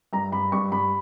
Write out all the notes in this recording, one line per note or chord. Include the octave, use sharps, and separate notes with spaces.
G2 A#5
G2 B5
G2 C#6
G2 B5